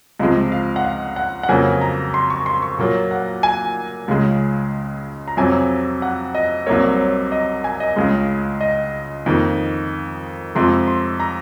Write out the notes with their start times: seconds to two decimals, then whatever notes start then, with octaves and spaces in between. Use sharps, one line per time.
0.19 C#2 C3 F3 G#3 D#5
0.52 F5
0.76 F#5
0.84 F5
1.16 F#5
1.43 F#5
1.49 F2 C#3 F#3 A#3 G#5
1.81 A#5
2.14 C6
2.30 C#6
2.46 C6
2.62 C#6
2.78 A#2 F#3 A#3
3.11 F#5
3.43 G#5
4.08 C#2 C#3 G#3
5.28 A#5
5.37 F2 C3 F#3 G#5
6.02 F#5
6.35 D#5
6.66 C2 C3 F#3 A#3 C#5
6.95 C#5
7.32 D#5
7.64 G#5
7.80 D#5
7.96 C#2 C#3 G#3
8.61 D#5
9.26 F2 D#3 A#3
10.55 F2 C3 F3 G#3 C6
10.88 C6
11.20 A#5